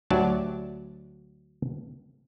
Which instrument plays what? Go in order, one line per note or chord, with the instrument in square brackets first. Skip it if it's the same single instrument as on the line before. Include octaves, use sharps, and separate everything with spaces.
[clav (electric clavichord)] D2 F#3 G4 D5 A5